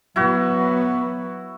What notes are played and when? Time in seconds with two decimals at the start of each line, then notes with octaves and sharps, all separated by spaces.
0.16 F#3 B3 E4 F#4